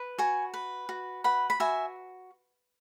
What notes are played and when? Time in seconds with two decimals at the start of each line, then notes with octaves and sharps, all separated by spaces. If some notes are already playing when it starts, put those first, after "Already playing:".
Already playing: B4
0.18 F#4 G#5 C#6
0.54 B4
0.89 F#4
1.24 B4 F#5 B5
1.50 B5
1.60 F#4 E5 G#5